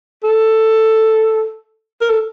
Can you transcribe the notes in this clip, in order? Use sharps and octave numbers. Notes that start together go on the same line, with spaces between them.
A4
A#4
A4